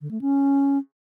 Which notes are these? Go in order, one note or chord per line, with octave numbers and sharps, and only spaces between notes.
D3
A3
C#4